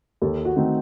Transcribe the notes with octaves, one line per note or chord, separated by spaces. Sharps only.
D#2 A4
F#4
D#3 A3 C4 D#4